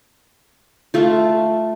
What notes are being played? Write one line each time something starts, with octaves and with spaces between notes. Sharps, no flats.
A3 F4